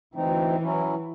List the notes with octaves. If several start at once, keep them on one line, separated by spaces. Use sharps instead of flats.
D2 E3 C4 D#4
F#3 C#4 E4